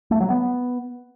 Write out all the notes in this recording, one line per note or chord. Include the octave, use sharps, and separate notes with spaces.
A3
F#3
B3